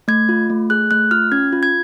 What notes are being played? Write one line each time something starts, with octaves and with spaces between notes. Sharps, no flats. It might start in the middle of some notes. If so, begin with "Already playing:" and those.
A3 G#6
F4
A3
G#4 F#6
A3 F#6
F4 F6
C#4 G#6
F4
G#6